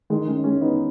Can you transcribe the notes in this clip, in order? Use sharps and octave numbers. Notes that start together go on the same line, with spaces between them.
D#3 G#3
G#3 C#4
G#3 C#4
B3 D#4